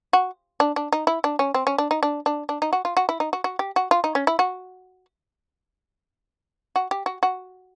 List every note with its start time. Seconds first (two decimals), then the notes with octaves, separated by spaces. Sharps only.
0.13 F#4
0.60 D4
0.76 D4
0.92 D#4
1.07 E4
1.24 D4
1.39 C#4
1.54 C4
1.67 C#4
1.78 D4
1.91 D#4
2.03 D4
2.26 D4
2.49 D4
2.62 D#4
2.73 F#4
2.85 F4
2.97 F#4
3.09 E4
3.20 D#4
3.33 F#4
3.44 F#4
3.59 G4
3.76 F#4
3.91 F4
4.04 D#4
4.15 C#4
4.27 E4
4.39 F#4
6.76 F#4
6.91 G4
7.06 F#4
7.23 F#4